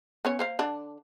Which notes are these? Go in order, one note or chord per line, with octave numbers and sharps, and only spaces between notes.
B3 C#4 C#5
A#3 C5 F5
D3 D4